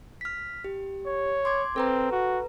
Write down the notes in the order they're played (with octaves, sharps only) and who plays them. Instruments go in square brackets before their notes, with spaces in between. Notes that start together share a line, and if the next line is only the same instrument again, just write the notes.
[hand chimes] F6 B6
G4
[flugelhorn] C#5
[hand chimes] C6 D6 G#6
[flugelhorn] C4 [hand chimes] A4 B4 A#5
[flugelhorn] F#4